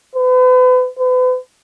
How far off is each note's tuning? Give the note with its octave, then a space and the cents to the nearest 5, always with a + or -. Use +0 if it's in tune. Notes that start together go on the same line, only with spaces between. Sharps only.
B4 +40
B4 +40